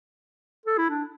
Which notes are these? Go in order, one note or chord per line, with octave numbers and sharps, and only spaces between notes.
A4
E4
D4